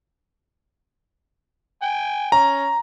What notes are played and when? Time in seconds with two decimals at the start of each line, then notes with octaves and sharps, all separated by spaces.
1.82 G5 G#5
2.32 C#4 A#5